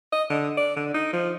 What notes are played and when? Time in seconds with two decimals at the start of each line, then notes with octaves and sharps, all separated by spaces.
0.12 D#5
0.30 D3
0.58 D5
0.77 D3
0.94 D#4
1.13 F3